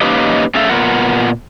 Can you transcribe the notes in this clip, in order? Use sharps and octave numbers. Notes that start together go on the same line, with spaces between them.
A#3 C#4 D#4 G4 B4 D#5
A3 C#4 G#4 A4 E5 F5
A#2 B3 F4 A#4 F#5